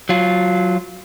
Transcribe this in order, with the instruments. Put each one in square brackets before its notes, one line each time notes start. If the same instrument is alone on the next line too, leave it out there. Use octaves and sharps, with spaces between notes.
[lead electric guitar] F#3 F4